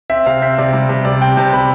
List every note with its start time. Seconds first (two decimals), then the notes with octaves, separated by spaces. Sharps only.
0.10 C4 E5
0.26 C3 F5
0.42 C4 E5
0.58 C3 D5
0.73 G3
0.89 C3
1.05 C3 D5
1.22 C4 G5
1.37 C3 A5
1.53 C3 B5